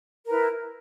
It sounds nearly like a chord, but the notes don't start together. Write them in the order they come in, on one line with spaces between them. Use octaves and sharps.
A#4 B4 E4